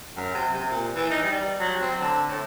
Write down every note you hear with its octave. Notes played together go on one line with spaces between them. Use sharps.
F#2
C3
C3
A#2
E3
D#4
G3
F#3
C4
D3
A2